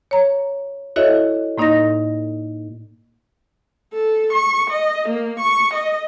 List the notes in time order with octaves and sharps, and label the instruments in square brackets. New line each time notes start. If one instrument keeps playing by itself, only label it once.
[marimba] C#5 A#5
E4 F#4 A4 C#5 D#5 E5
A2 A#3 D#4 D5 D#5 A#6
[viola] A4
C#6
D#5
A#3
C#6
D#5